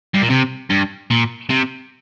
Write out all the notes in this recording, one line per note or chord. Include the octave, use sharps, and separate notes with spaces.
G2
A#2
C3
G2
A#2
C3